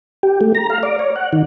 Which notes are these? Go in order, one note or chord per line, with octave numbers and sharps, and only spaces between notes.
G4
A3
A#5
F5
D5
C#5
F#5
D#3